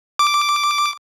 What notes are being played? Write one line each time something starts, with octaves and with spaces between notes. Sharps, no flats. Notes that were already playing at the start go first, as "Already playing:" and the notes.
D6